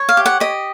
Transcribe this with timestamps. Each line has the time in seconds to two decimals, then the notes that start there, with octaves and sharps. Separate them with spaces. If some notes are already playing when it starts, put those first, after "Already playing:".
Already playing: C#5
0.09 F5
0.17 G4
0.26 F#5
0.40 G4 D#5